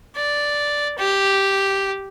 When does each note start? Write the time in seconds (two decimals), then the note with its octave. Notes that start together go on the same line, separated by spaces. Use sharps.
0.16 D5
0.98 G4